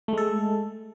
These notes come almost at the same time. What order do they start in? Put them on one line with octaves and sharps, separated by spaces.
A3 G#3 A4